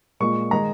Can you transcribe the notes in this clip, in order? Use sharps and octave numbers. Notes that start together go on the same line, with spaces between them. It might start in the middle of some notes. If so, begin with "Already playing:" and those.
A#2 G#3 C#6
D#3 G#3 A#5